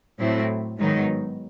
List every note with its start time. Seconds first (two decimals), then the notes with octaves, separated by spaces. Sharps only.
0.19 A2 F#3 A3 C4 E4
0.78 G#2 D#3 F#3 B3 D#4